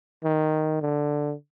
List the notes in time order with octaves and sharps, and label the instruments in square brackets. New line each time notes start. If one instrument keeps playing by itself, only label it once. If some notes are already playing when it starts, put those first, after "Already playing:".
[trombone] D#3
D3